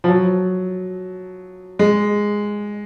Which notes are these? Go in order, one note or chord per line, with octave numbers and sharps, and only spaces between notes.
F3
F#3
G#3